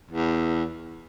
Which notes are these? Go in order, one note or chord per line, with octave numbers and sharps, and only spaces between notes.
E2